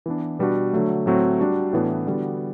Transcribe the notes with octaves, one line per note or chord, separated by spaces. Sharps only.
E3 B3 D4
B2 G3 B3 D4 F#4
D3 F#3 A3
A2 F#3 A3 C4 F#4
G3 D4 F#4
A2 E3 B3 D4
D3 G3 B3 F#4